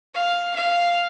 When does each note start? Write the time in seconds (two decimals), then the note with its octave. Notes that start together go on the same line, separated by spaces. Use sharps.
0.14 F5
0.56 F5